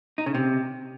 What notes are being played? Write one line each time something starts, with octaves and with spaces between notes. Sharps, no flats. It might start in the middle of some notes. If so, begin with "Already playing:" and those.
D#4
C#3
C3